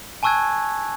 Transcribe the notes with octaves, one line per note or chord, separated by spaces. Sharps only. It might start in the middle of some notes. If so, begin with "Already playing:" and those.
G#5 A5 C#6 E6 F#6 G#6